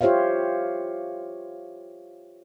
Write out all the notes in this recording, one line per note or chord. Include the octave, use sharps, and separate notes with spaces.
F4 G4 C5 C#5 E5 F5